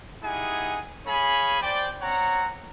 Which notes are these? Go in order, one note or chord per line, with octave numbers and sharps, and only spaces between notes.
D#4 E4 G4 G#4 F#5 G#5
G#4 C#5 F5 G#5 B5
C5 D5 G5
C4 C#5 F#5 A#5